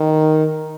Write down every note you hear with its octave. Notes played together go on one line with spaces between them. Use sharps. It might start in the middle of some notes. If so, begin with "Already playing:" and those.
Already playing: D#3